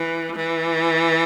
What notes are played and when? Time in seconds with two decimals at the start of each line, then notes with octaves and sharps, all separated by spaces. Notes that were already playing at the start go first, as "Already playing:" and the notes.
Already playing: E3
0.36 E3